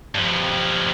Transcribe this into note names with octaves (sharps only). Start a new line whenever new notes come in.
G2 F3